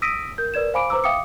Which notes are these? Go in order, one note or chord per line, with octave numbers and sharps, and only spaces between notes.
D#6 E6 A#6 B6 D7 D#7
A#4 G6
A#4 B4 D5 G#6 E7
C5 F5 G#5 B5 D6 D7
B4 C5 A#5 D6 E6
E5 F5 G5 D6 D#6 C#7